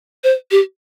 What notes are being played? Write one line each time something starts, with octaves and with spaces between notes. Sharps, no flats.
C5
G4